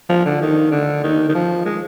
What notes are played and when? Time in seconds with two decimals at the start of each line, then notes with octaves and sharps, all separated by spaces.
0.09 F3
0.26 D3
0.42 D#3
0.71 D3
1.04 D#3
1.29 D#3
1.34 F3
1.66 G#3